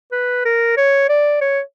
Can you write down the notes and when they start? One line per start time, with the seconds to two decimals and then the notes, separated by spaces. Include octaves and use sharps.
0.12 B4
0.45 A#4
0.77 C#5
1.09 D5
1.41 C#5